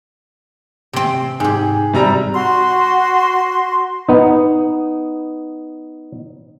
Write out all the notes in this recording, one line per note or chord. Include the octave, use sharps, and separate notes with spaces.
C3 C4
G#2 G4 G#4
C3 G3 A#5
F#4 C6
B3 D#4